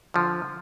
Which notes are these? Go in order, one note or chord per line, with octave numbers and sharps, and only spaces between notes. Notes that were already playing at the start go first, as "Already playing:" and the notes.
D3 F3